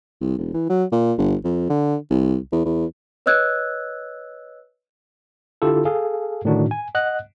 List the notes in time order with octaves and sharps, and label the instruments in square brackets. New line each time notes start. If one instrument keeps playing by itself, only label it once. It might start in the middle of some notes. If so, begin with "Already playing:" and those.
[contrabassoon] C2
E1
E3
F#3
A#2
G1
F2
D3
C2
E2
E2
[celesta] B4 C#5 D#5 E6 F#6 G#6
[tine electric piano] D3 E4 F4 G4 A4
G#4 A4 F5
A2 D3 D#3 D4 D#4 F#4
G#5
D#5 F#5 F#6